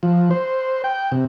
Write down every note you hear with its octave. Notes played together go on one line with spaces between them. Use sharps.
F3
C5
G5
C3